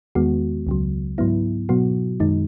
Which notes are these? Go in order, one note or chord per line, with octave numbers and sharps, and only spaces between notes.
E2 D#3 G#3 B3 F#4
C#2 C#3 F#3
G#2 F#3 B3 E4
B2 F#3 B3 F#4
F#2 D#3 G#3 D#4